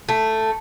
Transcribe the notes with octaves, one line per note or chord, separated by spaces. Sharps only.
A3